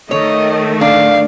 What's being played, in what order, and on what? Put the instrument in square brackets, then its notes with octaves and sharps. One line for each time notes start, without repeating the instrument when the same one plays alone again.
[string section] D#3 A3 [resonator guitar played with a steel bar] C#5 [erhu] D#5
[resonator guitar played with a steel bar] D4 [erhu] F5